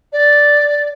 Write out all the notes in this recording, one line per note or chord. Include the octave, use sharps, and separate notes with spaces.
D5